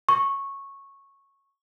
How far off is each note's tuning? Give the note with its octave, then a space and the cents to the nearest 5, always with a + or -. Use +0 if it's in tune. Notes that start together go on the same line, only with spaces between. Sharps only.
C#6 -10